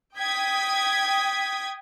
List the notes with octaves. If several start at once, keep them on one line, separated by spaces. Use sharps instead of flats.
G5 D#6 G#6 B6